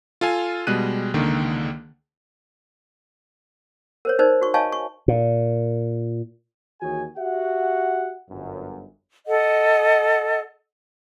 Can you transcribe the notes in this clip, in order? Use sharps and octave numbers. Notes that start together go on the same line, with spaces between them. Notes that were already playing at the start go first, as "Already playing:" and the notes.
F4 A4 F5 G#5
B2 G3 G#3 F#6 D#7
C#2 D3 D#3 A#3
A#4 C5 C#5
D#4 A#4 C5 D5
F#4 C#6
C#5 D#5 F5 G#5 A5 C#6
C#6
A#2
D#2 E3 F#4 G#4 C#5 G#5
F#4 G4 E5 F#5
G1 F#2
A4 D#5 F#5